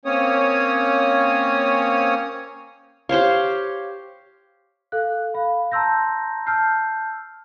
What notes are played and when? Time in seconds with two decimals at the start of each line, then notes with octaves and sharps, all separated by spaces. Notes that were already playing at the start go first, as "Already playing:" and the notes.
0.05 A#3 C4 C#4 C#5 D#6
3.09 G4 C5 C#5 F5
4.92 A4 F5 F#6
5.34 F5 B5
5.72 A5 A#5 C6 E6 G6 A#6
6.46 A5 E6 F6 G6 C7